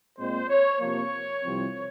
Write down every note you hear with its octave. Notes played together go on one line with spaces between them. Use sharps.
A#2 G#3 C4 C5
C#5
C3 F3 A#3 C#5
C2 C3 F3 C4